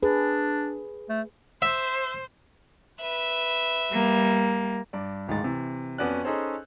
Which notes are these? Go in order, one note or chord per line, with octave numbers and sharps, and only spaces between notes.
D4 G#4 B4
A3
C5 E5
B4 E5
G3 A#3
G2 D5
D1 C#2 G#2 D#3 G#4 A6
C3 E3
F2 B3 C#4 F#4 D5 F#6
C#4 D#4 G#4 A4 C5 C#5